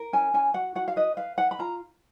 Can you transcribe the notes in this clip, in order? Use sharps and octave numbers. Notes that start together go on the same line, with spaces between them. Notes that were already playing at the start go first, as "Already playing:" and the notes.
Already playing: A#4
C#4 G#5
C#4 G#5
F#4 F#5
F#4 F#5
F5
B4 D#5
B4 F5
B4 F#5
B5
F4 A#5